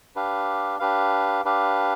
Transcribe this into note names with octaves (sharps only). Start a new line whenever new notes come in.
D4 G4 B4 F5
D4 G4 B4 F5
D4 G4 B4 F5